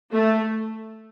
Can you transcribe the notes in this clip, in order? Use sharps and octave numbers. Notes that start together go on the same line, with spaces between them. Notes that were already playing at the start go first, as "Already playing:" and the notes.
A3